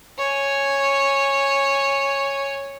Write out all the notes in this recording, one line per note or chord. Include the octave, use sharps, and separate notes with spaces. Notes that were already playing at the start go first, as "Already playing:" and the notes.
C#5 G#5